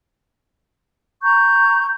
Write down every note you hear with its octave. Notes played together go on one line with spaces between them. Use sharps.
A#5 C#6 G6